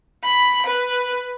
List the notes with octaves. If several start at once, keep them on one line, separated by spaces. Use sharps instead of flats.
B5
B4